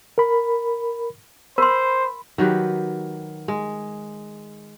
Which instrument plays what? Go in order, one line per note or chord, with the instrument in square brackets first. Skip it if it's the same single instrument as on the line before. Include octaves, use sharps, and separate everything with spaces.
[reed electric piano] A#4 B5
[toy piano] A#4 C6 [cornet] C5 [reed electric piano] B5
[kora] D#3 F#3 G4 B4
G#3